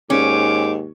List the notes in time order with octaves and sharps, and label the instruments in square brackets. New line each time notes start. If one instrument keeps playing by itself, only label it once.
[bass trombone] D#2 [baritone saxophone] G#2 [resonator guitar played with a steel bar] C#4 [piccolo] D6